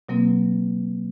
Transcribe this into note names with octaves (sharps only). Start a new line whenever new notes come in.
B2 F#3 A#3 C4